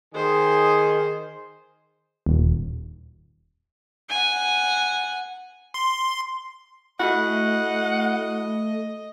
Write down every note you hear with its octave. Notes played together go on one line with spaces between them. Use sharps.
D#3 G#4 C5
D#1
F#5 G#5
C6
A3 E4 F#4 D#5 F#5